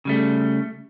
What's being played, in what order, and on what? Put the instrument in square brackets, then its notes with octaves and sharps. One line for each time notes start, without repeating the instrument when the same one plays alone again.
[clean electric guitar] C#3 G3 A3